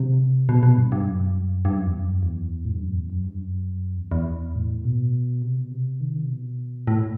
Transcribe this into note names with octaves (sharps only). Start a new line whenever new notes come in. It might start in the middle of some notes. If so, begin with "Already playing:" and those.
Already playing: C3
B2
B2
G2
G2
F#2
G2
F#2
E2
F#2
E2
A2
G2
F#2
E2
F#2
G2
F#2
E2
E2
A2
B2
C3
B2
C3
D#3
C3
B2
A2